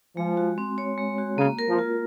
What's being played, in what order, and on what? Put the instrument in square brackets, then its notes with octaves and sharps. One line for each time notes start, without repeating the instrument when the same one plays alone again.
[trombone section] F3 [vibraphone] G#3
[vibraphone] F#4
C4
C#5
G#3
F#4
[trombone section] C#3 [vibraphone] A#3
[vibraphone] A#4
[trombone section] F3
[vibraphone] F4